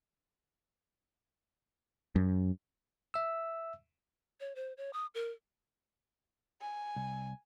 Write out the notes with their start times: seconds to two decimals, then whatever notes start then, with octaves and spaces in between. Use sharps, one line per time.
2.16 F#2
3.14 E5 E6
4.40 C#5
4.55 C5
4.77 C#5
4.93 D#6
5.15 A#4
6.61 G#5
6.96 C2